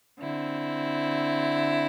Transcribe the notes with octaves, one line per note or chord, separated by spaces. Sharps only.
D3 C4 E4